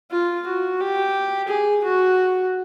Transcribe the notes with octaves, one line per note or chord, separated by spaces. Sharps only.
F4
F#4
G4
G#4
F#4